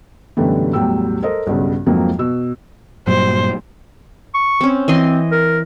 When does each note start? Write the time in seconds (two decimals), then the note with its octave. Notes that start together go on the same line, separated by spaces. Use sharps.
0.37 F#2 B2 D3 E3 G3 A3
0.73 E2 A2 F#3 G3 G5 E6
1.23 A4 A#4 C5 D#5
1.47 B1 G2 C#3
1.86 F2 G#2 F3 F#3 A#3 C4
2.19 B2 E6
3.07 G2 A#2 F#3 C5
4.34 C#6
4.61 C4 C#4
4.88 E3 C4 D#5 C6
5.31 A#4